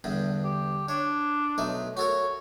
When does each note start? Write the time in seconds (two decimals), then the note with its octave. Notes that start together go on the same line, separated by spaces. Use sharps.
0.04 E2 G2 D3
0.44 G4
0.89 D4 C#5
1.58 B1 A3 D#4
1.97 F#4 A4 A#4 C#5